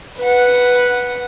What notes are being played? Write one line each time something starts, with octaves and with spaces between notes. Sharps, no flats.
B4 F#5